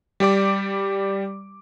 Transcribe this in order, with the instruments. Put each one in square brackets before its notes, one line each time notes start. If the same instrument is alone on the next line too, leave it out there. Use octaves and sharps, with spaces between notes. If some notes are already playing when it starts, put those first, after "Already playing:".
[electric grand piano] G3 G4 D5 D6